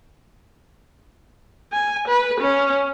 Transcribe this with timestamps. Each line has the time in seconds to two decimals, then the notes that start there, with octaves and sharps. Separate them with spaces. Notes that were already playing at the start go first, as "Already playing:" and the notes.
1.72 G#5
2.07 B4
2.40 C#4